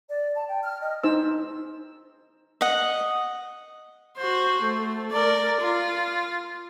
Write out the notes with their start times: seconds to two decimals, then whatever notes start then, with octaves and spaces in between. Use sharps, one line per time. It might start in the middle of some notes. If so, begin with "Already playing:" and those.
0.08 D5
0.35 A5
0.48 G5
0.63 F6
0.80 D#5
1.03 D#4 C5 E6
2.61 D#5 F#5
4.17 F#4 C5
4.62 A3
5.12 A#4 D5
5.60 F4